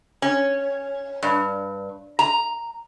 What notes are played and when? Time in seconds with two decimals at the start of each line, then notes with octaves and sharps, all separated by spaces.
0.22 C#4
1.23 G2
2.19 A#5